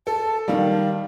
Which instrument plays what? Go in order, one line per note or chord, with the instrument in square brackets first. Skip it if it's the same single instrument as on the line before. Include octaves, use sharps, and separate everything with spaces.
[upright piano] A4 [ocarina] A5
[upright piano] D#3 G3 [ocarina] F5